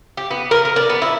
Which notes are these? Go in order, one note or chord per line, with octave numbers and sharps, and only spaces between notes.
G4
B3
A#4
A#4
D4
B3
E4